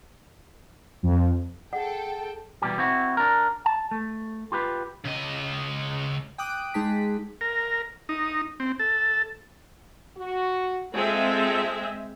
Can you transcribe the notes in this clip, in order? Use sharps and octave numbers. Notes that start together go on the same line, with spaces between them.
F2
G#4 A4 F#5 G5
B2 E3 G3 G4
C4 E4 F#4
D4 A#4
A5
A3
F4 G4 B4
C#3 D#5
G5 D6 D#6 F#6 D7
G#3 D#4 G#4 A5 B6
A#4
D#4
C4
A4
F#4
G#3 C4 F4 A4 E5